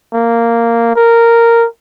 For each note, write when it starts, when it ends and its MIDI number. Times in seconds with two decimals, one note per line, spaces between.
0.13 0.91 58
0.96 1.66 70